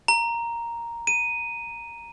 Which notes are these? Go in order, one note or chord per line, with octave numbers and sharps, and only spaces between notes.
A#5
D#7